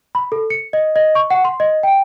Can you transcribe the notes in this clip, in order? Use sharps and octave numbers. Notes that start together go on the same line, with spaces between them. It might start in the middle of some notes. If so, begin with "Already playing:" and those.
B5
A4
C#7
D#5
D#5
C#6
F#5
C6
D#5
G5